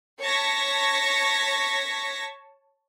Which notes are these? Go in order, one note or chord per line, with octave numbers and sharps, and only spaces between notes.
C#5 A5 C#6 G#6 A#6 B6